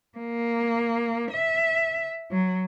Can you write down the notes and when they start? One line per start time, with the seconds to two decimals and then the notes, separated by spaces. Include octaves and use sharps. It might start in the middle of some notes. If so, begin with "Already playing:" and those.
0.18 A#3
1.31 E5
2.31 F#3